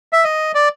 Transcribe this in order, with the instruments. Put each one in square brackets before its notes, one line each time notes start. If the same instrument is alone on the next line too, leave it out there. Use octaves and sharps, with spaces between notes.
[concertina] E5
D#5
D5